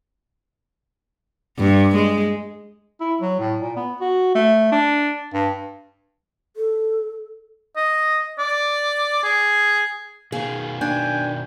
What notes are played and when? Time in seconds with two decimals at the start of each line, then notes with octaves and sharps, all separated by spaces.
1.59 G2
1.95 G#3
3.00 E4
3.21 F#3
3.39 A2
3.60 A#2
3.76 B3
4.00 F#4
4.35 A3
4.72 D4
5.33 G2
6.57 A4
7.76 D#5
8.39 D5
9.23 G#4
10.32 B2 D#3 G#4 F5
10.81 D4 G5 G#5